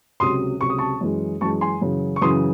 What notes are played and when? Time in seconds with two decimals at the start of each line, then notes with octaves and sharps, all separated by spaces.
0.20 C#2 C3 F#3 C6 D#6
0.60 C#2 C3 F#3 C#6
0.70 D#6
0.78 A5 C#6
1.01 F#2 E3 G#3
1.41 F#2 E3 G#3 A5 C#6
1.61 G#5 C6
1.81 F#2 C#3 E3
2.16 C#6
2.21 F#2 C#3 E3 C6 D#6